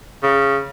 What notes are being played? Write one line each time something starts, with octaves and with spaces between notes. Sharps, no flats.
C#3